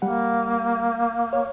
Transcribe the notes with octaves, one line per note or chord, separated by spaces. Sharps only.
G3 A#3 F#5
C#5